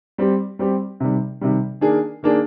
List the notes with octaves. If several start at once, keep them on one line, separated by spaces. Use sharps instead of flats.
G3 C4 G4
G3 C4 G4
C3 D#3 G3
C3 D#3 G3
D#3 A#3 D4 G#4
D#3 A#3 D4 G#4